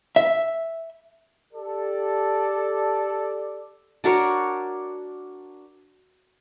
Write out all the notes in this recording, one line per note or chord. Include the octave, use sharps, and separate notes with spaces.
E5
G4 A4 D5
D4 F#4 A#4 C#5